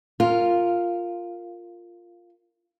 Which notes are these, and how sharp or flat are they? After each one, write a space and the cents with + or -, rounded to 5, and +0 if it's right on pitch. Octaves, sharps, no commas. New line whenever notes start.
F4 +0 A#4 -15